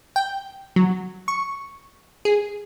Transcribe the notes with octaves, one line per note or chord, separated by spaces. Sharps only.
G5
F#3
C#6
G#4